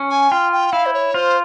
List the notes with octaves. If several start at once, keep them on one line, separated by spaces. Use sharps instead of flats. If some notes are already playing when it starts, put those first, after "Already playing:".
Already playing: C#4
G#5
F4 G5
G5
E4 F5
C5
C#5
F4 C5